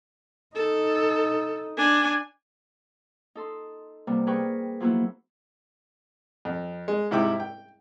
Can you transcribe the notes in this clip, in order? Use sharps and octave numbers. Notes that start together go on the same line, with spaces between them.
D#4 A4
D4 G#5
D#4 A4 C6
C3 G3 A#3 B3
G#4 A#4 B4 G5 C#6
F3 F#3 A#3 B3 E4
F2
G#3
G#2 C3 E4 G#4 G5 D6
G5